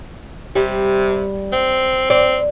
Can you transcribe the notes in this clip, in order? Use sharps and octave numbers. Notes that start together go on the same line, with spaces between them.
C3 G3
C4
C4 D5